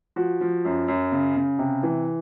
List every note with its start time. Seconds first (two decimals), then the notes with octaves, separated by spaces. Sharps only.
0.16 F3 F#4
0.41 F3
0.65 F#2
0.88 F#2
1.12 C#3
1.36 C#3
1.59 C3
1.83 E3